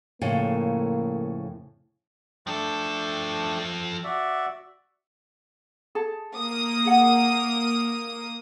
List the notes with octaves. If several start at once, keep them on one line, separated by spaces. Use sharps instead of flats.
F2 A2 C#3 A#3
F3 A3 D4 A4 G5
F#4 D5 E5
G#4 A4 A5
A#3 D#6
G#4 F#5